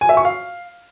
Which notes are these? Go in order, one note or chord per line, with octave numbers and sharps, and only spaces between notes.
G#5
E5
C#6
F5